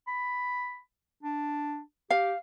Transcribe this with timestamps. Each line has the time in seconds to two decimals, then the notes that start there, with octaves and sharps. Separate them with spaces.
0.07 B5
1.23 D4
2.10 G4 F5